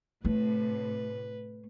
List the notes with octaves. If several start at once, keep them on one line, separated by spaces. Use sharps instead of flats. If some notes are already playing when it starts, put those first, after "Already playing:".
A2 C3 A3 B4